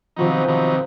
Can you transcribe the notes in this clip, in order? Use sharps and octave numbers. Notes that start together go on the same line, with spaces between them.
C3 D#3 F3 F#3 B3 D#4
C3 D#3 F#3 B3 D#4